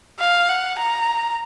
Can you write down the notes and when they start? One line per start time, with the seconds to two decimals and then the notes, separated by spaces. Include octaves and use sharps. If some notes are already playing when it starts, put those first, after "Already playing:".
0.19 F5
0.49 F#5
0.79 A#5